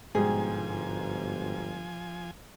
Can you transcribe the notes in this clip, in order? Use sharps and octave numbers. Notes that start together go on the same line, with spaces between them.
G1 G#2 B2 F3 G3 G#4 G#5